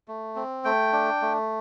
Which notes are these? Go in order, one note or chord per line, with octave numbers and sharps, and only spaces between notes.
A3
C4
A3 G5
D4
A3